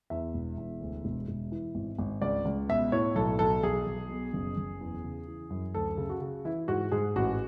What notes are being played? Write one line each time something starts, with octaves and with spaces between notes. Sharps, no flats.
E2 E5
E1
E2
D2
E1
E1
E3
G#1
G#1
C#2 D5
C#2
B2 E5
A2 C#5
B1 A4
B1 A4
B1 G#4
B1
B2
F#1
F#1
E2
C#3
E3
F#2
D2 A4
C#3
F#4
C#3
E3 E4
G#2 F#4
G#2 G#4
A1 F#4